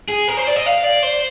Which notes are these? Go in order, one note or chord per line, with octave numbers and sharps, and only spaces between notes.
G#4
A#4
C5
D5
D#5
F5
D5
C5